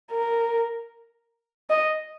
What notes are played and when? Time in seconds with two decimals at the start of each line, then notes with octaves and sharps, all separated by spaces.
0.11 A#4
1.70 D#5